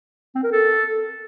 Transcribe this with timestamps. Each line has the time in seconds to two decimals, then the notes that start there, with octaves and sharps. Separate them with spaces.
0.35 C4
0.43 A#4
0.51 A4